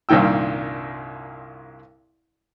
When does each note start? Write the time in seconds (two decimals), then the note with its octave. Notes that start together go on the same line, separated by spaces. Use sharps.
0.09 C2 G2 A#2 D#3 G5 E6